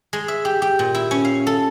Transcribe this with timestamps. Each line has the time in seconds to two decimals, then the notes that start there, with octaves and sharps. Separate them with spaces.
0.13 G#3
0.28 E5
0.45 G4
0.62 G4
0.79 A#2
0.94 E4
1.11 C#4
1.25 F5
1.47 A4